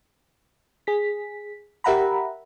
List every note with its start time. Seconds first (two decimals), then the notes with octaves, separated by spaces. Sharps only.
0.87 G#4 B6
1.84 G4 A#4 E5 F#5 A#5 B5